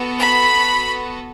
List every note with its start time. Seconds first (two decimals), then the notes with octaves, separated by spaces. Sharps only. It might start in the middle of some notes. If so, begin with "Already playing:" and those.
Already playing: B3 F#4 A4
0.20 B5